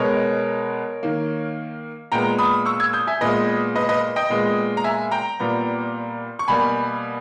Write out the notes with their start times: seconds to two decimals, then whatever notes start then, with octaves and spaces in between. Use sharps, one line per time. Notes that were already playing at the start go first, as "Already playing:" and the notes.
Already playing: B2 G#3 B3 A#4 C#5
1.03 D#3 A#3
2.12 A#2 G#3 B3 G5 A#5
2.39 B5 D#6
2.66 C#6 E6
2.80 E6 G#6
2.93 D#6 G6
3.07 E5 G#5
3.21 A#2 G#3 B3 B4 D#5
3.75 B4 D#5
3.89 B4 D#5
4.16 D#5 G5
4.30 A#2 G#3 B3
4.77 A#5
4.84 E5 G#5
5.11 G5 A#5
5.40 A#2 G3 B3
6.39 C#6
6.48 B2 G3 A#3 G#5 B5